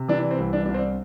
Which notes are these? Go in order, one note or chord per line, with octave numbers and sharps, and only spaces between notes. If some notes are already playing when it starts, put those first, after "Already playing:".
Already playing: C3
E3 D4
C4
C2
D4
C2 D4
C4